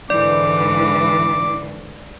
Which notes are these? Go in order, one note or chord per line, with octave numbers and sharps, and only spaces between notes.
G#2 D3 E3 D5 D6